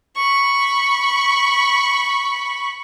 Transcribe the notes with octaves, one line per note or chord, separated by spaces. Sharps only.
B5 C#6